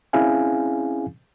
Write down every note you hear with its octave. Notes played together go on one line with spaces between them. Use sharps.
C4 C#4 E4 G#4 F5 G#5